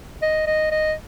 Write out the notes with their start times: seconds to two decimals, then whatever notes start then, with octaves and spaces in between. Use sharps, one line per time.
0.22 D#5
0.47 D#5
0.71 D#5